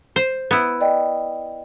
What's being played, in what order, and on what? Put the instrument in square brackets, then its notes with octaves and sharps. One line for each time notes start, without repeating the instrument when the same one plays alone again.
[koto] C5
B3 E4
[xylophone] D5 D#5 G5